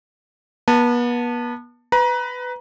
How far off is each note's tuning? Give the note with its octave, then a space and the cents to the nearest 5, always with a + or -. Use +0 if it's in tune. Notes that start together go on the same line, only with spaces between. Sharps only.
B3 -35 A5 +15
B4 +15 A#5 +35